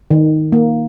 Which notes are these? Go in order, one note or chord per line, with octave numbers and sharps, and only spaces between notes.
D#3
A#3